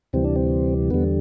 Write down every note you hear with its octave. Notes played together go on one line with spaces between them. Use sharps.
D2 C3 E3 G3 C4
D4
C4
E2 D3 G3 B3